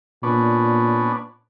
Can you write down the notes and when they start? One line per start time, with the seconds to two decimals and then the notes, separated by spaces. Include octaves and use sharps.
0.23 A#2 B3 C#4 D4